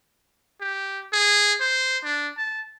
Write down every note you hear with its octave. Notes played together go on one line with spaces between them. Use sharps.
G4
G#4
C5
D4
A5